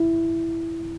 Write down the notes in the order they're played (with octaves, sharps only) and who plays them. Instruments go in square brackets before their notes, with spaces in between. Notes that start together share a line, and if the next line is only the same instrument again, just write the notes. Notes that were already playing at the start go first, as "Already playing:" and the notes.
Already playing: [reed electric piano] E4